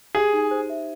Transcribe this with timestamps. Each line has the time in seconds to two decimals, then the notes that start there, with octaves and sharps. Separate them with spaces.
0.15 G4 G#4
0.33 D#4
0.51 C5
0.70 E5